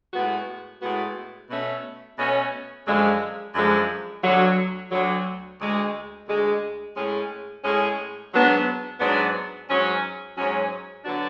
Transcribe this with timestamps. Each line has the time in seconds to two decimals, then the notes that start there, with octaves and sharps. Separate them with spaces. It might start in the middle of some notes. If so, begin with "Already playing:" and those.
0.13 A2 G#3 B3 F#4
0.81 A2 G#3 B3 F#4
1.49 B2 A3 C#4
2.18 B2 A3 C#4
2.86 F#2 D3 F3 G#3
3.54 F#2 D3 F3 G#3
4.23 D2 D3 F#3
4.90 D2 D3 F#3
5.59 D2 D3 G#3
6.27 D2 D3 G#3
6.95 A2 G#3 C#4 G#4
7.64 A2 G#3 C#4 G#4
8.31 G#2 F#3 B3 D4
9.00 G#2 F#3 B3 D4
9.69 G#2 F#3 C#4
10.37 G#2 F#3 C#4
11.04 D3 F#3 B3 D4 F#4